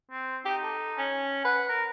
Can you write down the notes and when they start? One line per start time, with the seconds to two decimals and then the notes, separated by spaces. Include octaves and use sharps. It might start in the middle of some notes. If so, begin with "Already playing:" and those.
0.11 C4
0.45 D#4 G4
0.63 A4
0.98 C#4
1.45 B4 F#5
1.69 A#4